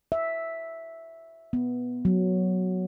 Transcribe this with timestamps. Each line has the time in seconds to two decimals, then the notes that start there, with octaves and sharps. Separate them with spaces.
0.12 E5
1.53 B3
2.05 F#3